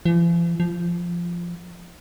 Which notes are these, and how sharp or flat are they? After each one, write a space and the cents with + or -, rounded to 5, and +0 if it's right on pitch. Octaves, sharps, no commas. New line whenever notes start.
F3 -45
F3 -10